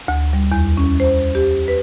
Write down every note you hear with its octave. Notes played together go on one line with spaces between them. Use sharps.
D2
G3
E2
C#4
C5
G4
B4